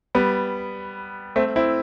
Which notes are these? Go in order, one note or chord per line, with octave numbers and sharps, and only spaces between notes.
G3 B3
A3 C4
C4 E4